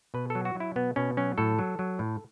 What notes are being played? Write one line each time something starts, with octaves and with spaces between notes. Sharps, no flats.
B2 B4
A4
F#3
F#4
F#3
E4
B2 B3
B2 C#4
F#3 C#4
A2 A4
F#3
F#3
A2